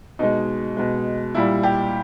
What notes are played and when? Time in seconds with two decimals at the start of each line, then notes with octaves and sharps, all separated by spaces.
0.19 B2 G#3 D#4
0.77 B2 G#3
1.35 A#2 G3 E4
1.63 G4